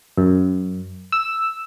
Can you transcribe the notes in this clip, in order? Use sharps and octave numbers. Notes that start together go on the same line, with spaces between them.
F#2
E6